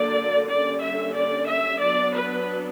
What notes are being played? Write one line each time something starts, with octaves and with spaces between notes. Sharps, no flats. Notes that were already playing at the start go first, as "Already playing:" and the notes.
Already playing: D3 F#3 A#3 D5
D3 G3 A#3 C#4 D5
E5
D5
E5
F#3 B3 D4 D5
B4